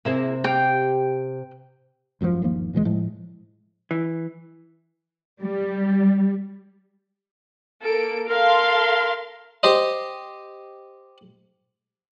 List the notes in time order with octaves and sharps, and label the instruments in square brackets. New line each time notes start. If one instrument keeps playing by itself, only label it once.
[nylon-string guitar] C3 [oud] A#3 E4 G#4
[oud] G4 F5 [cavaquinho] G5
[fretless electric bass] G#1 F#2 A#2 F3
G1 D#2 F3 A#3
D2 A#2 E3 G#3
A2 F3 G#3
[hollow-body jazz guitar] E3
[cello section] G3
[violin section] A#3 D7 [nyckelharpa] A4
[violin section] A4 F5 C6 [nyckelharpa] A#4
[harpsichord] G4 C5 D#5